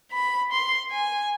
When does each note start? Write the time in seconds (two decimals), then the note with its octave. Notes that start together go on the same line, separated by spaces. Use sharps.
0.12 B5
0.52 C6
0.91 G#5